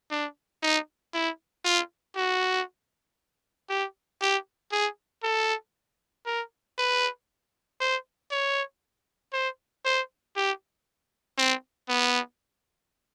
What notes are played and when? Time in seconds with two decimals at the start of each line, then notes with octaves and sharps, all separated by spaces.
0.11 D4
0.63 D#4
1.14 E4
1.65 F4
2.16 F#4
3.70 G4
4.22 G4
4.72 G#4
5.23 A4
6.26 A#4
6.78 B4
7.80 C5
8.31 C#5
9.33 C5
9.85 C5
10.36 G4
11.38 C4
11.89 B3